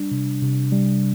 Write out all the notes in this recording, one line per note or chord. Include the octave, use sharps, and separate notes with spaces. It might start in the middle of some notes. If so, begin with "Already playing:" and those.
Already playing: G3 D4
C3
C3
G3